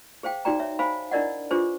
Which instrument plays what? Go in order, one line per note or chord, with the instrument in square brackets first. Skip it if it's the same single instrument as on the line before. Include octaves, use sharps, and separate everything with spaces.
[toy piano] G#4 C5 F5 G5
D#4 F#4 G#4 D5 G5 A#5
C#5 E5
C5 F5 G#5 B5
D4 E4 A#4 D5 D#5 F#5
D4 F4 G4 G#4 B4 C5